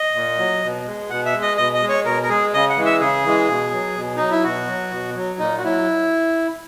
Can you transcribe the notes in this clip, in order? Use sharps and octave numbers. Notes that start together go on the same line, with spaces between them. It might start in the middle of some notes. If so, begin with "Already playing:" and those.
Already playing: D#5
A#2
F#3
B2
G#3
B2 F#5
E5
G#3
D#5
B2 D#5
D#5
G#3
C#5
B2 A#4
A#4
G#3 G#4
C#3 D#5
F#5
E3 G#3
E5
C#3 G#4
E3 G#3
B2
F#3
B2
F#3 D#4
E4
B2 F#4
F#3
B2
F#3
A#2 D#4
F#4
F#3 E4